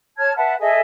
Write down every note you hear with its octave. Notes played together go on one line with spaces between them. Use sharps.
C#5 A5 F6 G#6
B4 E5 F#5 A5
G#4 A4 D#5 E5